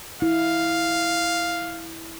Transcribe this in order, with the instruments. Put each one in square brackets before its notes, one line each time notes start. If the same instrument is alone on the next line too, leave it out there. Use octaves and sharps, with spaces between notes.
[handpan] E4 [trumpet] F5